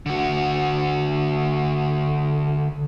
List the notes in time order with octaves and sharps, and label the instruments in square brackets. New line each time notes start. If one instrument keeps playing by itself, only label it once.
[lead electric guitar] D3 F#4